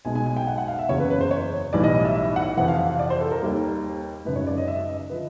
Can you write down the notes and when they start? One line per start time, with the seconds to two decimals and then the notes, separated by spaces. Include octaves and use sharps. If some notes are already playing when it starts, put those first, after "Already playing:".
0.05 B1 B2 G#3 G#5
0.15 G#5
0.26 G#5
0.36 G5
0.47 F#5
0.58 F#5
0.68 F5
0.79 E5
0.89 F#1 E2 C#3 C#5
1.00 B4
1.10 B4
1.21 C5
1.31 C#5
1.73 B1 A2 E3 G3 D5
1.84 D#5
1.95 D#5
2.05 E5
2.15 E5
2.36 F#5
2.57 F2 C3 E3 F#5
2.68 F5
2.78 F5
2.99 D5
3.10 C5
3.21 A4
3.31 A#4
3.42 D#2 D#3 G3 A#3
4.25 G#1 F#2 C#3 B4
4.36 C#5
4.47 D5
4.58 D#5
4.68 E5
4.89 D#5
5.10 D3 F3 B4